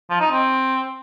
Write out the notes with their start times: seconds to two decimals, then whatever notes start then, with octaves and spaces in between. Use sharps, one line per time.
0.10 F3
0.20 D#4
0.31 C4